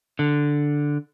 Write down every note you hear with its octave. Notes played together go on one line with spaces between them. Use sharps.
D3